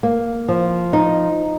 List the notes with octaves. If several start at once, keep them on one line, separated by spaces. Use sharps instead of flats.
A#3
F3
D#4